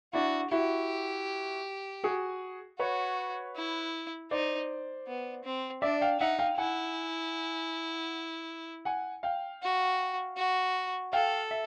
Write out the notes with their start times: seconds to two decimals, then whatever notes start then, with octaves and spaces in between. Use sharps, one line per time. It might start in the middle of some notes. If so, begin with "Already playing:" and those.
0.13 D4 E4 F#4
0.51 E4 F#4 G4
2.04 F#4 G#4
2.79 F#4 B4 C#5
3.56 E4
4.31 D#4 C5 D5
5.07 B3
5.44 C4
5.82 D4 D5 E5
6.01 F5 G5
6.20 D#4 E5 F#5
6.39 F5 G5
6.58 E4 F#5 G#5
8.85 F#5 G#5
9.23 F5 G5
9.62 F#4
10.37 F#4
11.13 A4 F5 G5
11.51 E5